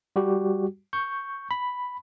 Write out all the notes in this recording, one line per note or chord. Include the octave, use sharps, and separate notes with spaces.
G3 F#4 G4
C#6 G6
B5